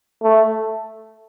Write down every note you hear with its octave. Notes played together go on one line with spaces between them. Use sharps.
A3